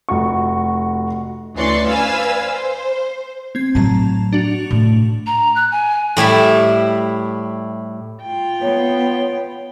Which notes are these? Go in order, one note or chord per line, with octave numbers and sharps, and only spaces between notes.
F1 F#4 C#6
D2 E3 C#4 D5 C6 C#6
B4 C5 D5 F5 G#5 E6
C5
C4 G#6
A2 F#3 A5 A#5
D4 F#4 F7
A2
A#5
F#6
G#5
A2 G3 E4 E5
F4 G5
B3 C#5